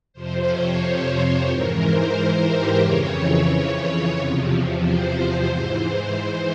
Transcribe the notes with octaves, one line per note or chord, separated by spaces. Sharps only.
F2 C3 F3 C5
C#5
C5
G#2 E3 A#4
C5
A#4
G4
F2 C#3 E3 C#5
E2 C3 F3
C5
G#2 E3
C5